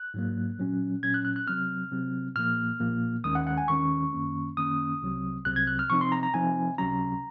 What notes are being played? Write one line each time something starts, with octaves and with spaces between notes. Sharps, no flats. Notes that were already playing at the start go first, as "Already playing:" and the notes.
Already playing: F#6
G#2 F#3 A#3
A#2 F#3 C#4
A#2 F#3 C#4 G#6
F#6
F#6
F#6
C3 F#3 C4 F6
C3 F#3 C4
A#2 F3 A#3 F6
A#2 F3 A#3
D#2 D#3 G#3 C#4 D#6
F#5
F#5
G#5
D#2 D#3 G#3 C#4 C#6
F#2 D#3 A#3 C#4
F#2 D#3 A#3 C#4 D#6
C2 C3 F#3 C4
C2 C3 F#3 C4 F#6
G#6
F#6
F6
C3 F3 C4 D#4 C#6
C6
A#5
A#5
C3 F3 C4 D#4 G#5
C#2 C3 F#3 C#4 A#5